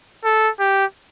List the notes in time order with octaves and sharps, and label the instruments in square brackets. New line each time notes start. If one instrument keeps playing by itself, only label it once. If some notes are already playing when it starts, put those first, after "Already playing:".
[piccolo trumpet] A4
G4